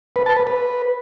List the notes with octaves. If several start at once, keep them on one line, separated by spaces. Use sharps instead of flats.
B4
A5
B4
B4